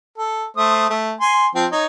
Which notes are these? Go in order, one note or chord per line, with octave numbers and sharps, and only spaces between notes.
A4
A3 C5 D#6
A3
G#5 C6
F3 C4
D#4 C#5